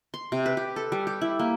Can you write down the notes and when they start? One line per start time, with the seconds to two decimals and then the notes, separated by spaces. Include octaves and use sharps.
0.14 C6
0.32 C3
0.46 B4
0.57 G4
0.76 A4
0.92 G3
1.07 G4
1.21 E4
1.39 A#3